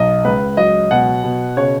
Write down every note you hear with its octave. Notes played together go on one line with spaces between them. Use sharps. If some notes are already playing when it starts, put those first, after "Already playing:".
Already playing: B1 D#5
C#2 B4
F#3 D#5
B2 F#5
B2
C#3 C#5